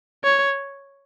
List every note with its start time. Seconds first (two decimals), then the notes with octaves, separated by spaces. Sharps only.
0.24 C#5